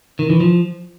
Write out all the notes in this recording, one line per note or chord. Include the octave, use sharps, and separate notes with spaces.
D#3
E3
F3